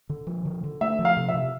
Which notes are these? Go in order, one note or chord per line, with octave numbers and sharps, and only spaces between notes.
D3
F3
D3
D3
A3 E5
F3
F5
C3
E5
C3